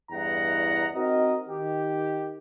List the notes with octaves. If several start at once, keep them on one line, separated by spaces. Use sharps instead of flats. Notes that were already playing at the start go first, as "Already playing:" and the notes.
E2 G2 E4 D#5 F#5 A#5
C4 D#4 F#4 A#4 D#5
D#3 G4